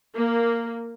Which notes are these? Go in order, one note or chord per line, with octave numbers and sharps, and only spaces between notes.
A#3